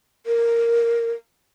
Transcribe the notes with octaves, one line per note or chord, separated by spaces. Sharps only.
A#4